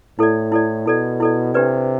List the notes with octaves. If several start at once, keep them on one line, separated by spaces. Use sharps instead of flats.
A2 E4 A4 D5
E4 A4 D5
B2 E4 A4 D5
E4 A4 D5
C3 D4 G4 B4 D5